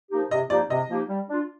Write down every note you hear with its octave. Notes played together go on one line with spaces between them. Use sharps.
F3 A#3 D#4 G4
C3 D#5
F3 A#3 D#4 G4 D5
C3 D#5
F3 A#3 D#4 G4
G3
D4 F4